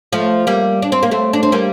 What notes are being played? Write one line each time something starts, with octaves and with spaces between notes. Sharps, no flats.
F3 A3
G3 A#3
D4
C4
A#3
A3 C4
D4
C4
G3 A#3